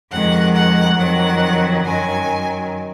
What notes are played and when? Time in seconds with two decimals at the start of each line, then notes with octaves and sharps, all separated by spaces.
0.11 F2 D#3 G#3 F#5
0.55 F#5
0.97 F2 D#3 F#3 F#5
1.84 F#2 D#3 F#3 G#5